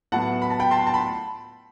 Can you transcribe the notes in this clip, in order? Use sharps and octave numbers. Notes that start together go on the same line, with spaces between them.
A2 F#3 B3 E4 F#5 A5
B5
A5
G5 B5
A5 C6
A5
B5